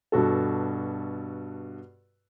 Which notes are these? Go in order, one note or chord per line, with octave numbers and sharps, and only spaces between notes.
G2 B2 F#4 A4